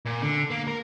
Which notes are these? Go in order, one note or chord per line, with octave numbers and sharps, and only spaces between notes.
A#2
D3
A#3
A#4